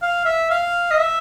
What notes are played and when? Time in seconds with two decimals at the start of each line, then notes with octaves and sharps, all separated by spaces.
0.02 F5
0.25 E5
0.50 F5
0.91 D#5
0.98 E5